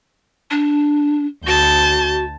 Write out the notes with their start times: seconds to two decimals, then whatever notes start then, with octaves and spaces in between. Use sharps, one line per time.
0.51 D4
1.47 D2 F#4 A5 G6